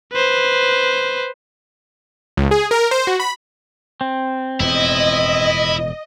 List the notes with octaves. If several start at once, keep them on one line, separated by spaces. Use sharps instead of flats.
B4 C5
C#2
G#4
A#4
C5
F#4
B5
C4
E1 F2 A2 E4 D#5